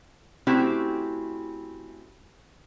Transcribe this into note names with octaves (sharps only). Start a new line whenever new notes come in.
A3 C4 C#4 E4 F#4 G4